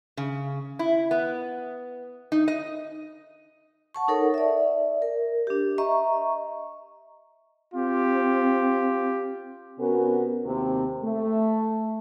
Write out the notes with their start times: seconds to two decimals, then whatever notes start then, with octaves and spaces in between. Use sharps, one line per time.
0.17 C#3
0.79 E4
1.11 B3
2.32 D#4
2.48 D#5
3.95 F#5 A5 C#6
4.08 D#4 A4 A#4 C#5 F#5
4.34 D5 E5
5.02 A#4
5.47 D4 G4
5.78 D#5 E5 A#5 C#6
7.74 C4 F4 G4
9.79 C3 B3 C#4 F#4 A#4
10.45 D#2 C3 C4
11.03 A3